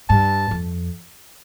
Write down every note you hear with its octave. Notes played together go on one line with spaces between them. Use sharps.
G2 A5
F2